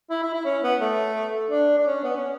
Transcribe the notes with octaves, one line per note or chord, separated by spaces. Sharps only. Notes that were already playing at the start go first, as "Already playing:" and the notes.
E4
E4
E4
C#4
B3
A3
D4
D4
C#4
B3
C#4